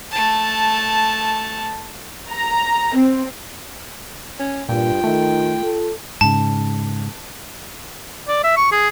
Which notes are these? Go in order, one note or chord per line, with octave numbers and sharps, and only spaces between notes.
A3 A5
A#5
C4
C#4
G2 A#2 F4 G5
D#3 A3
A4
G#2 C#3 A5
D5
E5
C#6
G#4